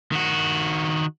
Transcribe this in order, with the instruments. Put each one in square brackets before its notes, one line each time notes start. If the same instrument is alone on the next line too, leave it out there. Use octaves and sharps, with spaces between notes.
[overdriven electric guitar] D#3 F#4